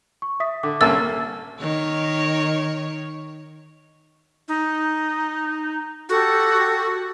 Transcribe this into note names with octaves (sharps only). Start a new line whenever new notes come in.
C#6
E5 D#6 B6
D3 D6
C2 A#3 C#4 A4 E5 A5 E6 A6
D#3 C#5
D#4
F#4 G4 A4